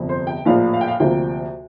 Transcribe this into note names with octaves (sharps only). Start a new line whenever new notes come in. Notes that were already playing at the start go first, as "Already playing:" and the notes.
Already playing: G1 F2 C3
C5
G5
A#1 A2 F3 A#3 F5
F5
G5
F5
D2 C3 F3 A#3 G5